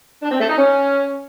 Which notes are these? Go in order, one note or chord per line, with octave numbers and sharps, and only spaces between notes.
D4
C4
A3
D#4
C#4